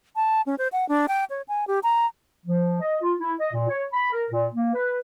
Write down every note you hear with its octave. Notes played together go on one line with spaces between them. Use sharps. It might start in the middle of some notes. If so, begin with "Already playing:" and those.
A5
C#4
C5
F#5
D4
G5
C#5
G#5
G4
A#5
F3
D#5
F4
E4
D#5
A#2
C#5
B5
A#4
A#2
A#3
B4